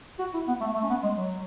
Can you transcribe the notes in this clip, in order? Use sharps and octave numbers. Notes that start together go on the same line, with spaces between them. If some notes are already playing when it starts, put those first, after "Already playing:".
F#4
E4
B3
A3
A3
C#4
B3
G#3
F#3